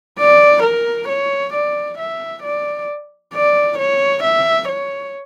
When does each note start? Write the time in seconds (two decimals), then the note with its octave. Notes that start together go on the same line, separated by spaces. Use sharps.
0.19 D5
0.63 A#4
1.09 C#5
1.54 D5
1.99 E5
2.43 D5
3.34 D5
3.78 C#5
4.24 E5
4.69 C#5